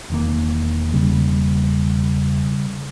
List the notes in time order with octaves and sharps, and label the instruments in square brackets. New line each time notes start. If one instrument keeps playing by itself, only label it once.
[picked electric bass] E1 D#3 A#3
[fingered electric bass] C#3 G3